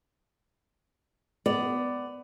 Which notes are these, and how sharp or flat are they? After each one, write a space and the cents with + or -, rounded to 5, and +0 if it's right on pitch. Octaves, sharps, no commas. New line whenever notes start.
B3 +20 D5 +0